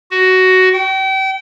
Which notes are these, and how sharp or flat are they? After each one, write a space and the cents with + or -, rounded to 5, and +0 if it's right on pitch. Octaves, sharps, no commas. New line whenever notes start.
F#4 +10
G5 -35